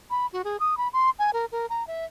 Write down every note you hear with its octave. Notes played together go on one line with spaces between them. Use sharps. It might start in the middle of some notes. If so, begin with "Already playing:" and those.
B5
F#4
G#4
D#6
B5
C6
G#5
A#4
A#4
A#5
E5